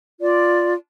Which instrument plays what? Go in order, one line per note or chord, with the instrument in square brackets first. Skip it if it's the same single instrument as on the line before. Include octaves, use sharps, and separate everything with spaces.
[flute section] F4 D5